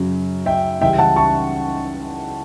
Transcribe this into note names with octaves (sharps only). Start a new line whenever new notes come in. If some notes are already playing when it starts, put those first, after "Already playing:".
Already playing: F#2 C#3 F#3
E5 G5
C#2 C#3 E3 G3 E5 G5
F#5 A5
A5 C#6